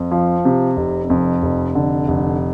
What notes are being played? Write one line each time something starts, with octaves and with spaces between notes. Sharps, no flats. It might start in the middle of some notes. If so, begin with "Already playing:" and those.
Already playing: F2
F3
C3
F1
F2
F1
D3
F1